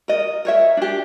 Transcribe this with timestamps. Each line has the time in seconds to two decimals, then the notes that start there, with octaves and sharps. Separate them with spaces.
0.08 A#4 D#5
0.45 A#4 C#5 E5
0.77 D4 G4